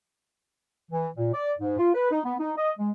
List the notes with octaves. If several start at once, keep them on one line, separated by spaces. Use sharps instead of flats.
E3
A#2
D5
G#2
F4
B4
D#4
B3
D#4
D#5
G#3